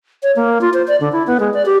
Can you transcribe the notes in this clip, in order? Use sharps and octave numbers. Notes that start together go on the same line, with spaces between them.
C#5
A#3
F4
C5
D5
D3
E4
B3
G#3
D5
G4